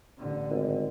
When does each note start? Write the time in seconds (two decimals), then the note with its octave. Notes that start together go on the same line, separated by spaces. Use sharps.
0.18 A1 D3
0.51 G#1